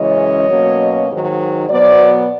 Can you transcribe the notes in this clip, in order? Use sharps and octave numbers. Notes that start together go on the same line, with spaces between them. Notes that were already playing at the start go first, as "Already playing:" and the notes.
Already playing: F#2 C#3 E3 G#3 C#4 C#5 D#5
B2 F#3 A#3 C#4
G#2 D#3 F#3
B2 F#3 B3 C5 D5